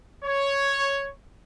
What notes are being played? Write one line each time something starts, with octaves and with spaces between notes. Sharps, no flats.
C#5